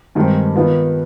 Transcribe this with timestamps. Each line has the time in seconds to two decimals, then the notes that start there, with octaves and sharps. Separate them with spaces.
0.15 G2 D#3 G#3 C4 G4
0.55 D#3 B3 F4